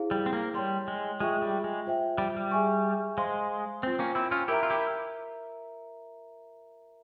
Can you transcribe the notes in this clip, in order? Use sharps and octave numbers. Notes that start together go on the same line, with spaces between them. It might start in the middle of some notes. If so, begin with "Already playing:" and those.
Already playing: E4 G#4 C5 F5
G3
C4
A#3
G3 C#5 G5 C6
G#3
G#3 F4 G#4 E5 G5 C#6
G3
G#3
F4 C5 E5 G5
G3
G3
G#4 E5 G#5 C#6
G#3 C5 F5 C6
C4 F4 C5 G5
A#3 C#4
C4 E4
C#4 F4
E4 G4 A#4 E5 A#5
F4
E4 G4